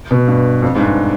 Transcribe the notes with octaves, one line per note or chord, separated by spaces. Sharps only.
B2
G2
F2
G#2
G2